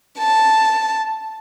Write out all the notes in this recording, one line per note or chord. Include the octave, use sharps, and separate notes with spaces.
A5